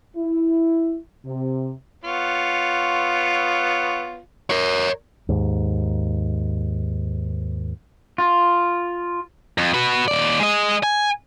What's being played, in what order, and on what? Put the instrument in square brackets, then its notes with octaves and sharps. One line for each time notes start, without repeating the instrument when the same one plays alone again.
[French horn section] E4
C3
[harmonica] B3 F4 C#5
[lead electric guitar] A#4 C#5
[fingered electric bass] D#2 G#2
[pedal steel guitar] F4
[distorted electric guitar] F2
F#4 B4
D#2 D5
G#3 D#5
G#5